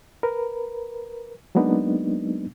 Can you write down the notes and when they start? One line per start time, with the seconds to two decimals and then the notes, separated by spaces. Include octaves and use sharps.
0.23 A#4 B4
1.55 F#3 G#3 A#3 B3 D4 D#4